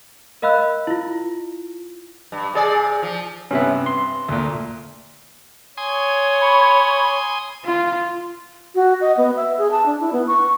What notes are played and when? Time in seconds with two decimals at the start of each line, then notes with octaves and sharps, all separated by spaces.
0.42 A#4 D#5 F5 B5 E6 F#6
0.87 E4 F4
2.32 G2
2.54 C3 G#4 D5
3.02 F3
3.51 G2 C3 B3 C#4 E5
3.86 C6
4.29 D2 A#2
5.77 C#5 G#5 C6 D#6
6.41 B5
7.65 F4
8.75 F#4
9.01 D#5
9.17 B3
9.36 E5
9.58 G#4
9.71 A5
9.86 D4
10.00 E4
10.13 B3
10.27 C#6